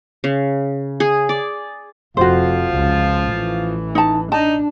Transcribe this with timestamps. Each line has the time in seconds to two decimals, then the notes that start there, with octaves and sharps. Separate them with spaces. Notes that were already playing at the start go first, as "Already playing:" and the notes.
0.24 C#3
1.00 G#4
1.29 D5
2.17 F1 F2 F3 F4 F#4 C5
2.74 C#2
3.27 A1 E3
3.95 D#4 A5
4.32 D4 D#4 A5